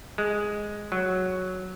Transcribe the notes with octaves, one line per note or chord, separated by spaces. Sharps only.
G#3
F#3